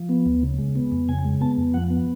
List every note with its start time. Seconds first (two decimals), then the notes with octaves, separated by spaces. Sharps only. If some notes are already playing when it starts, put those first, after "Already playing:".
Already playing: F3
0.09 B3
0.26 D2
0.43 C#3
0.58 G#3
0.75 B3
0.92 F2
1.08 C#3 G#5
1.25 G#3
1.41 B3 A5
1.58 F2
1.74 F3 F#5
1.90 B3